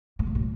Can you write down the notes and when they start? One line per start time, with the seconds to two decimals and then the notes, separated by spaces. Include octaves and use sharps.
0.19 A2
0.27 A#2
0.35 A2